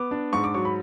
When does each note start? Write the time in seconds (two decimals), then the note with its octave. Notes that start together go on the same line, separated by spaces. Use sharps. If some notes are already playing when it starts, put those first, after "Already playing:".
Already playing: B3 D6
0.11 D4
0.33 G#2 C#6
0.44 D6
0.54 F#3 C#6
0.65 B5